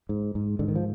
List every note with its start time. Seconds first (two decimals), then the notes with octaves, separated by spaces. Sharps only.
0.09 G#2
0.35 G#2
0.59 G#2 D3
0.68 D#3
0.75 F3